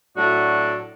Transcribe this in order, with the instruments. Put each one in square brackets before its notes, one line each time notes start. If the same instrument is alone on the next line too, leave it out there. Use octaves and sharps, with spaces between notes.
[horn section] A2 F#3 D4 F#4 D5